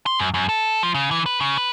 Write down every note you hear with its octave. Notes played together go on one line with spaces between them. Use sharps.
C6
F#2
F#2
A4
F3
C#3
E3
B4
C#3
B4